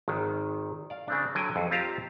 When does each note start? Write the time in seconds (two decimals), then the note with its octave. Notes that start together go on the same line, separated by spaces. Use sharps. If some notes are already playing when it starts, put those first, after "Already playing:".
0.08 G#1 D#3
0.90 D5 F5
1.08 C#3 C4 D4
1.35 D3 F#3 G5 G#5
1.56 F2
1.71 C4 F4 G4 F5 A5 A#5